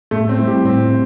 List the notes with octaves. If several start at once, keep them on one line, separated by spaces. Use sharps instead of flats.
A2 A3
C4
G3 E4
G4
A2 C4